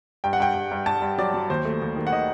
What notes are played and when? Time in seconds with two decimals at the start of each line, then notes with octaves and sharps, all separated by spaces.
0.24 G2 G5
0.33 F#5
0.40 G2 G5
0.55 G2
0.72 G2
0.86 G2 A5
1.02 G2
1.18 F#3 D5
1.34 F#3
1.50 D#2 C5
1.65 A3
1.82 D#2
1.96 D#3
2.07 F#5
2.13 D#3 D#5